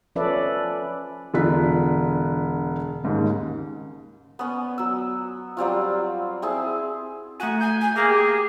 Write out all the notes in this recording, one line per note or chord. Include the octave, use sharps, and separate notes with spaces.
F3 C#4 A4 B4 D5 E5
E1 D3 F4 F#6 B6
D#2 G#2 C#3
B3 C#4
F#3 E6
F#3 G3 C4 F4
C4 E4 G#4 A5
A3 F#4 G#5
G#5 G6
G#5
A#3 G#4
G4